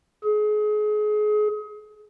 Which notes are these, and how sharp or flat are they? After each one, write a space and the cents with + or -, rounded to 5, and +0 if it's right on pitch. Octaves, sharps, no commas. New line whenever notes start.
G#4 +30